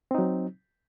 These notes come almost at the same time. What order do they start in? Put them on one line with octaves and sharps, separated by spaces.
C4 D#4 F#3